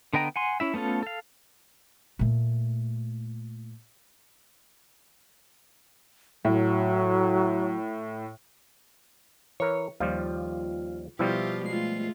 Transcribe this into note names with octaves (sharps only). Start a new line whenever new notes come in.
D3 B3 D#5 G5 A#5
F#5 G#5 C6
C#4 E4 E5
A3 B3 C#4 F4 A4
A4 F5
A#2 A3
A2 F#3
E3 A#4 C#5
D#2 F3 G3 F4
B2 F3 G3 E4 F4 G4
G#3 A3 F4 C7